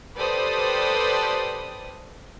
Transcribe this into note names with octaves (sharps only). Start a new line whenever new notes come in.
G4 A4 B4 C5 D5 D#6